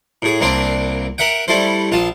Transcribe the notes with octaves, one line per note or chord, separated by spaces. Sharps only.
A2 G#4
C2 A#3 C4 D4 C6
A#4 E5 F#5 G5
G3 A3 E4 A4 C5
A#1 F4 A5